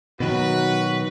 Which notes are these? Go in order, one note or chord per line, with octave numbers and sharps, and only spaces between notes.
B2 D#3 F#3 F#4 B4